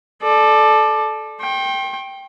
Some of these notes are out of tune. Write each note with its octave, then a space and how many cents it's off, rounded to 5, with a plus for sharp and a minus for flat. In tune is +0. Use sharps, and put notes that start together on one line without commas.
A4 -15 D5 +20
G5 +0 C6 +45